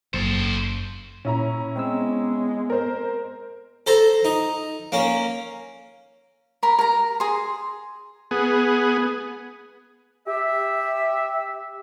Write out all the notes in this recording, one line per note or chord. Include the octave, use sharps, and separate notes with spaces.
F#1 A4 C5
A#2 C#4 E4 A#5
G#3 B3 C4 E6
A#4 C5
A4 C5 A#5
D#4
A#3 C#4
A#4 B5
A#4 A#5
G#4 C6
B3 G#4
G4 E5